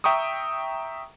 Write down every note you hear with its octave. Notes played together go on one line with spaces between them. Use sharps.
E5 G5 A#5 C#6 D#6